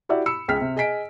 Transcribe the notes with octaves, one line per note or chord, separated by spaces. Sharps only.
E4 F#4 G4 D5 E5
B5 E6 C#7
C#2 G#4 G5 F6 B6
C3
G#4 D#5 G#5 B6 D7